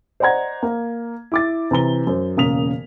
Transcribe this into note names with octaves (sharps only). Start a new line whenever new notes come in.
C5 D5 D#5 F#5 A#5 G#6
A#3
E4 D6 A6
C3 E3 A#5 G7
F#2 C5
E1 C#3 A#3 D#6 B6 F7